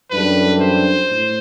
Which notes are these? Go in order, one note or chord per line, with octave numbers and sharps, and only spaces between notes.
F#2 E3 G3 D4 A4 B4
C5
A2